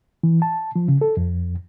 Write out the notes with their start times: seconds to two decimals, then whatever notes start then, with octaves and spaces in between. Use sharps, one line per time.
0.23 E3
0.42 A5
0.76 F3
0.88 C#3
1.01 A4
1.17 F2